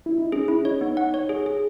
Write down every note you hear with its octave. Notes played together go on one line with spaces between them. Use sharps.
E4
D#4
C#4 G#4
E4
D#4 C#5
B3
F#5
C#5
G#4
G#4